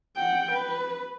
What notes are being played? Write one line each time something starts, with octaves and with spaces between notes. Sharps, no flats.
F#5 G5
B4